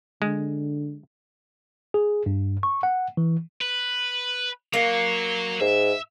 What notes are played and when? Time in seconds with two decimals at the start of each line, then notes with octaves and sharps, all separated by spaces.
0.22 D3 G#3
1.94 G#4
2.26 G2
2.63 C#6
2.83 F#5
3.17 E3
3.61 B4
4.73 F#3 A#3 C#5
5.61 G#2 E5